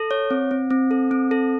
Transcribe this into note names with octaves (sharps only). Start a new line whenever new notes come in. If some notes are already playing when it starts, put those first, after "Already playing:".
Already playing: A4
C#5
C4
C4
C4
A4
C4
A4